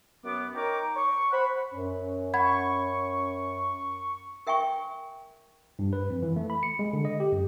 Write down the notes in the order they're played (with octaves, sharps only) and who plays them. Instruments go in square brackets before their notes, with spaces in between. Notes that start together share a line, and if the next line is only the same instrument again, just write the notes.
[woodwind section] F#2 B3 D6
D#4 A#4 C#5 G5 A#5 D6
C#6
C5 F#5 B5
[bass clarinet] F#2 [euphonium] C#4
[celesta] F#5 B5 G#6 [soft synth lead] C#6
[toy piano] A#4 E5 G5 G#5 C#6
[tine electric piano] G2
B4
F2
E3
A3
B5
C#7
G#3
D3
D#5
G4
F#2